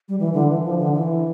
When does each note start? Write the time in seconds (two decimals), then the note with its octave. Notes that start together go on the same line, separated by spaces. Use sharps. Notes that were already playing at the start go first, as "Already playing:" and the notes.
0.09 G3
0.20 E3
0.34 D3
0.49 E3
0.64 F3
0.79 D3
0.94 E3